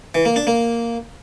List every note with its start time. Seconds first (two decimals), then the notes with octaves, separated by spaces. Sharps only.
0.15 E3
0.25 A#3
0.36 D4
0.47 A#3